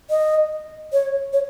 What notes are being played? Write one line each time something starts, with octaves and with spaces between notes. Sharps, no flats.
D#5
C#5
C#5